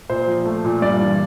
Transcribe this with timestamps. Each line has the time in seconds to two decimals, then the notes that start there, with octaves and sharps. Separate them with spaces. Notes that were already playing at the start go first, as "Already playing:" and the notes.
0.10 A#2 C5
0.27 F3
0.46 A3
0.65 A#2
0.82 G2 D5
1.00 E3